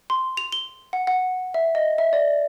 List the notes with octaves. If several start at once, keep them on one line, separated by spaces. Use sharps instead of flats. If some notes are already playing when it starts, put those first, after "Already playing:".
C6
F7
G7
F#5
F#5
E5
D#5
E5
D5